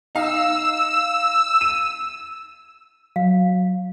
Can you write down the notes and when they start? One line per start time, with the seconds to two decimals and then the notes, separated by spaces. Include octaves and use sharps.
0.15 D#4 F5 E6
1.61 D#7
3.16 F#3 F5